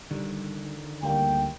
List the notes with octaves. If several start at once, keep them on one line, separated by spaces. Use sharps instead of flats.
D3 D#3 G3
D2 G3 A#3 G5